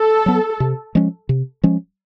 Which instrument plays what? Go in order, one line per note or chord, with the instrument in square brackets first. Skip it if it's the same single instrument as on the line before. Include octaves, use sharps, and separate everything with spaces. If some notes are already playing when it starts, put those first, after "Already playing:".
Already playing: [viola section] A4
[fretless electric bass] F#3 B3
C3
F3 G#3 C#4
C3
F3 G#3 C#4